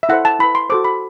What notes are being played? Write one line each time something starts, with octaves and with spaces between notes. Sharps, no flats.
E5
E4 A4 C5 F#5
A5
E4 B4 B5
C6
F#4 A4 C5 D6
B5